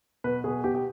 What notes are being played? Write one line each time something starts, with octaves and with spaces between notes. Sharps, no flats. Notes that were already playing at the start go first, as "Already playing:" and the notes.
B2 B4
B2 G#4
B2 G4
G4